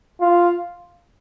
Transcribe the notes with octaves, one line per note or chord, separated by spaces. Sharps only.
F4